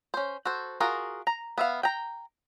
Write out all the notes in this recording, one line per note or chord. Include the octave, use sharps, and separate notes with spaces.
C#4 C5
F#4 A4 C5
F4 F#4 G#4 A#4
A#5
B3 E5 F5
G5 A#5